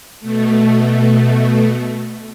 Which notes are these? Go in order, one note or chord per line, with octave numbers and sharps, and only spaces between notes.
B2 A3